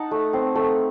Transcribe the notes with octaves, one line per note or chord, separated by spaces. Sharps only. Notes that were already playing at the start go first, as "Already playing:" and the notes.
Already playing: D#4 F#5 A5
A3
C4
A3